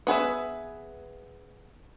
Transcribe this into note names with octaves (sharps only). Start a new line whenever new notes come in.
B3 G#4 B4 E5